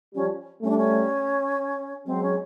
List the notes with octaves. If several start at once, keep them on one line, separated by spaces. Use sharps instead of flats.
F3 G3 C#4
G3 A3 C#4
D4
C#4
F#3 G#3 C4
C#4